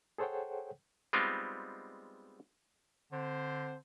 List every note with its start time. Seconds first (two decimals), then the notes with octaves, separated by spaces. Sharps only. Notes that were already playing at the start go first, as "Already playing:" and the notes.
0.18 G#4 A4 C5 C#5 F#5 G5
1.13 G3 G#3 B3 C4 D#4 F4
3.12 D3 C4 C5